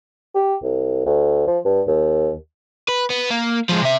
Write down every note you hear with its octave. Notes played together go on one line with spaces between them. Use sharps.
G4
C2
D2
F3
G2
D#2
B4
B3
A#3
F3 G#3
C3 E5